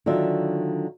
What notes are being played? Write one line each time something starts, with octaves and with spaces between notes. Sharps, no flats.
D3 D#3 F#3 F4 E5